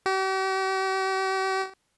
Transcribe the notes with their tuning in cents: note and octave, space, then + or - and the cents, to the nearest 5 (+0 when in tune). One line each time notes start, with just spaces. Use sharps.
G4 -45